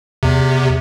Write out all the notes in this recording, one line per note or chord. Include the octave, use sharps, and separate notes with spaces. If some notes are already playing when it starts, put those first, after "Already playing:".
E2 C3